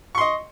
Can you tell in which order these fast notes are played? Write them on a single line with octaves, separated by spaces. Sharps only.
C#6 C6 D#5